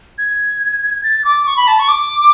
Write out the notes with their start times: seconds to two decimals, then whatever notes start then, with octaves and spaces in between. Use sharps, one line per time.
0.18 G#6
1.03 A6
1.24 D6
1.46 C#6
1.57 B5
1.67 A5
1.79 C#6
1.88 D6